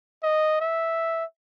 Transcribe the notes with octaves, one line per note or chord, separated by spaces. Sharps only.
D#5
E5